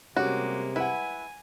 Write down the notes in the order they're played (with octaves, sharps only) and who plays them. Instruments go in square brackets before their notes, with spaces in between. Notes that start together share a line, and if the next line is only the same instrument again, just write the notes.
[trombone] C3 [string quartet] G3 G#3 A#3 [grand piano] C#4 G4 [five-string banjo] F#4
[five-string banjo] E4 [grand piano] B4 F#5 [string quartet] G#5